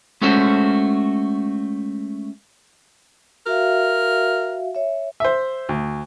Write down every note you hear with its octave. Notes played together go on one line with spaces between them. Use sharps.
G#3 A3 C#4 F#4 A4 C5
F#4 A#4 E5 F5
C#5 E5
C5 E5
D2